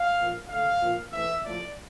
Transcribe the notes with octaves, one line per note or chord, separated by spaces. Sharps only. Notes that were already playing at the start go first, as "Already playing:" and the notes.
Already playing: F5
A#2 F3 A#3
D3 A3 F5
A#2 F3 A#3
C3 E3 A3 E5
A2 F3 A3 D5